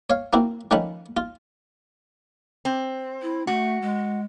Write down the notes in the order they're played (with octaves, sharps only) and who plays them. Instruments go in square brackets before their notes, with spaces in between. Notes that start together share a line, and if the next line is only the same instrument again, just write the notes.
[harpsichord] C#5 F5
A#3 C4 E4 F#4
D#3 F3 A3 C#4 F#5 B5
F4
[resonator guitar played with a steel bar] C4
[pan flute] E4
[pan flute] A3 [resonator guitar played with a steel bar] F#4
[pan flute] G#3